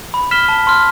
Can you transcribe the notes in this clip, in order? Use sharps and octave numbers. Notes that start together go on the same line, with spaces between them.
B5
F6 B6 E7 G7
A5
C6 F6